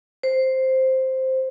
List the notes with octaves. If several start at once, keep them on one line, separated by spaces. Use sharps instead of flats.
C5